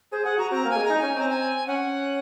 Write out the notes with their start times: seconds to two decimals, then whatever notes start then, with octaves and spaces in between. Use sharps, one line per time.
0.12 G#4 C5
0.25 G#4 F#5
0.38 F#4 A#5
0.51 C4 A#5
0.65 A#3
0.70 G#5
0.77 G#3
0.84 A#5
0.90 D#4
0.98 C#4 G#5
1.16 C4 A#5
1.29 G#5
1.67 C#4 F#5